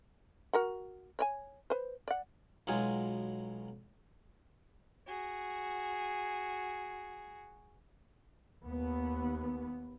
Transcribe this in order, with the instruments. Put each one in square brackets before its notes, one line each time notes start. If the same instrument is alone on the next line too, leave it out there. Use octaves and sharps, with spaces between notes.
[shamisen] F#4 A#4 F#5
C#5 D5 G#5
B4 C5
D5 F#5
[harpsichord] B1 F#3 G#3 F4 G#4 G#5
[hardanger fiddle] F#4 G#4
[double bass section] D#2 B3